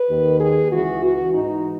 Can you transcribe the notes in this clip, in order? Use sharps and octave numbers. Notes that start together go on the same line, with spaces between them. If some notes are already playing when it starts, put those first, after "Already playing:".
Already playing: B4
D#2 D#3
G#4
C#2 C#3 E3 F#4
F#4
G#2 E3 D#4